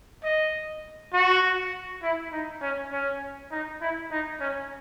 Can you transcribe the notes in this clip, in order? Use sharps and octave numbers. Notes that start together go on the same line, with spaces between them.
D#5
F#4
E4
D#4
C#4
C#4
D#4
E4
D#4
C#4